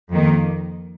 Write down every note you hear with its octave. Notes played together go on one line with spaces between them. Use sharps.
F2 D#3 A#3